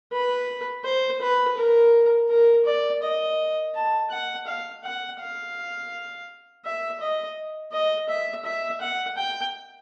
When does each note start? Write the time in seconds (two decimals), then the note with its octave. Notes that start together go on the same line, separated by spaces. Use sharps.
0.12 B4
0.84 C5
1.21 B4
1.57 A#4
2.29 A#4
2.65 D5
3.02 D#5
3.75 A5
4.10 F#5
4.46 F5
4.84 F#5
5.20 F5
6.65 E5
7.00 D#5
7.72 D#5
8.09 E5
8.45 E5
8.81 F#5
9.17 G5